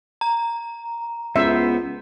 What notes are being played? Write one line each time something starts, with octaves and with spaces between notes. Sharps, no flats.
A#5
C#2 B3 C5 E5